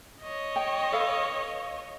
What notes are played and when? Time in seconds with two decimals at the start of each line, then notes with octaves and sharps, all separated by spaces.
0.22 C#5 D#5
0.56 G5
0.92 A4 B4 F5